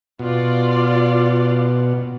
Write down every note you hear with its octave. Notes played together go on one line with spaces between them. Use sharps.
B2 F4 D5